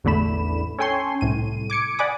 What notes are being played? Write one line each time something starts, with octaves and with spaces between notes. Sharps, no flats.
A1 E2 D3 A3 B5 E7
C#4 A4 G5 G#5 C6 C#6
C2 A2 D#7
D6 G#6 C#7 D7
D5 F#5 G#5 B5 D6 D#6